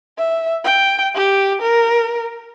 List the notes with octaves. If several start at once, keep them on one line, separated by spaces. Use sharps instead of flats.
E5
G5
G4
A#4